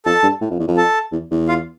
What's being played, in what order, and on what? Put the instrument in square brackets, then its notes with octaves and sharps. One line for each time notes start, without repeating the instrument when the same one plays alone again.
[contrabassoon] F2 [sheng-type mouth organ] A4 A5
[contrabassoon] G2
A2
F2
E2
F2
[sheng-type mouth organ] A4 A5
[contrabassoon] E2
E2
[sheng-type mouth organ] F4 F5